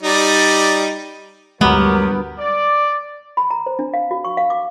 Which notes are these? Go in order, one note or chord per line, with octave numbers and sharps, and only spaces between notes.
G3 D#4 D5
D2 G2 F#3 G#3 B3 G4 A#4
D5
B5
A#5
C5
D4
F5
F#4
C#6
F5
D6